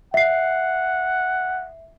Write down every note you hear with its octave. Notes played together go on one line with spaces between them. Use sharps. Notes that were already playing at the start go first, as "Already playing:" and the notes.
E5 F#5 C7